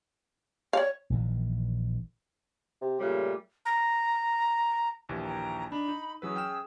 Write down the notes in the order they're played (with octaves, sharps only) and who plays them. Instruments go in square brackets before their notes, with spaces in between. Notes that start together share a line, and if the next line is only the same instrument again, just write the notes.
[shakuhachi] C#5 [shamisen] D5 F5
[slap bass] A#1 D#3 E3
[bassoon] C3
[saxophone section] A#2 G3 A3 [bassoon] C#3
[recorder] A#5
[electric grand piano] A#1 D#2 E3
[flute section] G5 A#5
[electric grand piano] D4 D#4 [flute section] B5
[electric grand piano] D#4
[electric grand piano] E3 F#3 B4 [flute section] C#4 G#4 E6
[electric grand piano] G5 F6 E7